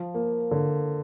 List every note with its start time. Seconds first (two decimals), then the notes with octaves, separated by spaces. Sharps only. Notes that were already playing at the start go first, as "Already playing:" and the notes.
Already playing: F3
0.14 A#3
0.51 D3